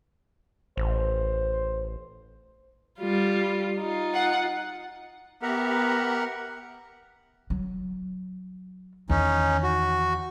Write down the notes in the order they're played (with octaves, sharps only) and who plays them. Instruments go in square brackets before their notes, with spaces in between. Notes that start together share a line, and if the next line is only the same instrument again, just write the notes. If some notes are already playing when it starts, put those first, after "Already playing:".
[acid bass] A1 [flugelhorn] C5
[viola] G3 F4
D#4 F4
[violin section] F#5
[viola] B3 [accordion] G4 E5 A#5 [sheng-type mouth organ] A#4 F#5
[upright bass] F#3
[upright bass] E2 D#3 [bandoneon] C#4 D#4
[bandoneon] F#4